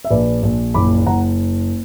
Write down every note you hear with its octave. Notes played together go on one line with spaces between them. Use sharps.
E5
A#1 B4 D5
A#1
F#1 B5 D6
F#1 F#5 A#5